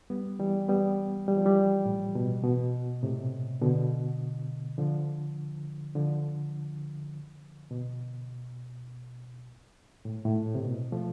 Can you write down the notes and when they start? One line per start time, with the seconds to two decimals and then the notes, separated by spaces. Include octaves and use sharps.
0.10 G3 B3
0.39 E3 G3
0.68 G3 B3
1.28 G3
1.37 F3
1.45 E3 G3
1.85 A2
2.15 B2
2.44 B2
3.03 A2 C3
3.61 B2 D3
4.78 D3 F3
5.95 D3 F3
7.71 B2
10.05 A2
10.25 A2
10.55 C3
10.63 B2
10.92 F3 A3